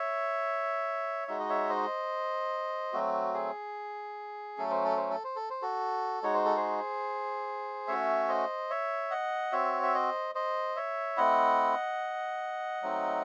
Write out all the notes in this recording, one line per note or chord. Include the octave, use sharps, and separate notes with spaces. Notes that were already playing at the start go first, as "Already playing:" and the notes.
Already playing: C#5 E5
G#3 D#4 F#4 E5
D#5
C#5 E5
C5 D#5
F#3 A3 C4 F#4
G#4
F#3 A3 C#4 A4
C5
A4
C5
A4
C5
A4
C5
F#4 A4
G#3 D#4 F#4 C#5
C5
A4
G#4 C5
A3 C#4 F#4 C#5 E5
C5 D#5
C#5 E5
D#5 F#5
C4 F#4 C#5 E5
E5
C5 D#5
C5 D#5
C#5 E5
A3 C4 E4 D#5 F#5
F#3 A3 C4 D#4